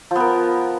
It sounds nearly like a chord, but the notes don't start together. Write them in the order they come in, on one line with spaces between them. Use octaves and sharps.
F3 B3 A#4